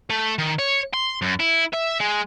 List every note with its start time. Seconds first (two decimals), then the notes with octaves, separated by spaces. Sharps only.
0.10 A3
0.38 D#3
0.59 C#5
0.94 C6
1.22 F#2
1.40 E4
1.73 E5
2.01 G#3